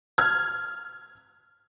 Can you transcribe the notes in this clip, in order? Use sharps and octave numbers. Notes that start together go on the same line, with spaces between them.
F6 G#6